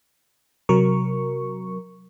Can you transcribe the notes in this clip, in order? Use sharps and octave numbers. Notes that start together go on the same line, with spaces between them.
C3 F#3 A#4 C#6